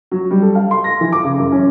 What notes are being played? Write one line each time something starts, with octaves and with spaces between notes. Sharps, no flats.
F#3
G3
A4
F5
C6
A#6
E3
D6
C#3
F#2
C#4